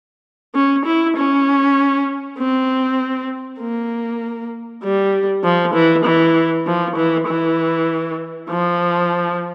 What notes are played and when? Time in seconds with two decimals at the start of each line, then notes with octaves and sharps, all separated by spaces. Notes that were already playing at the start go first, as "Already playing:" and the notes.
0.55 C#4
0.86 E4
1.17 C#4
2.38 C4
3.60 A#3
4.83 G3
5.44 F3
5.74 E3
6.05 E3
6.67 F3
6.96 E3
7.28 E3
8.49 F3